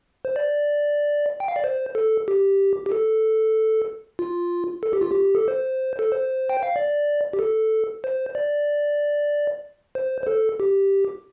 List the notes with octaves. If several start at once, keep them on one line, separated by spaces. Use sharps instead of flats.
C5
D5
G5
F5
D5
C5
A4
G4
G4
A4
F4
A4
G4
F4
G4
A4
C5
A4
C5
G5
F5
D5
G4
A4
C5
D5
C5
C5
A4
G4